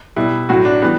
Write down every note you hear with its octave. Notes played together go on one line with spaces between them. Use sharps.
B2 G3 E4
A2 F#3 F#4
D4
E3 G3 B3